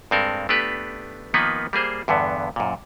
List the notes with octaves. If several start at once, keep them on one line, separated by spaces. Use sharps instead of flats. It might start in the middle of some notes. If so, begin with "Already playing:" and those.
G2 G#3 C4 A4 A#4
A3 B3 D4 G4 B4
D#3 F3 A#3 B3 D#4 B4
G3 A#3 G#4 C5
E2 G2 D3 B3
F#2 A#2